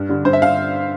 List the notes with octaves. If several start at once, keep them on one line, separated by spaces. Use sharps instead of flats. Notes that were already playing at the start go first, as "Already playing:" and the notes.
Already playing: G2
D3 G3
G2 C5
E5
D3 F5